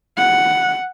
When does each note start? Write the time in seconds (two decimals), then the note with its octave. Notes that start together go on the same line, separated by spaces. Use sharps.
0.18 F#5